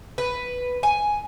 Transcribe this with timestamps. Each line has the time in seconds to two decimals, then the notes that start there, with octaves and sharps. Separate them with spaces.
0.18 B4
0.83 G#5